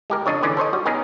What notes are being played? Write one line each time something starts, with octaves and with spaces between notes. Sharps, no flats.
G#3 G4 A#4
F2 C#3 D4 C#5 D#5
D3 E3 C#4 D5
A4 C5 C#5 D#5
G3 F#4
B3 C#4 D#4 G#4 A#4